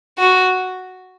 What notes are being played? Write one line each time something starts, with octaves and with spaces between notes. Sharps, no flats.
F#4